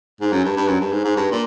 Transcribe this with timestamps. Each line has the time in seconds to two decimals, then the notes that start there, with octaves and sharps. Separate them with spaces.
0.21 G#2
0.32 F#2
0.44 G2
0.57 G2
0.68 F#2
0.81 G2
0.92 G#2
1.05 G#2
1.17 G2
1.31 A#2